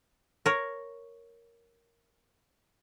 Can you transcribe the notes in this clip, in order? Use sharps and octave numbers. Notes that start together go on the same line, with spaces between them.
A#4 C#5